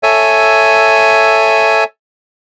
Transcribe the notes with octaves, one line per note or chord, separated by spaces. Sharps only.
A4 C#5 E5 G#5